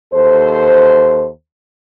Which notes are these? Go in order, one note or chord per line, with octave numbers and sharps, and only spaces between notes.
D#2 A4 C5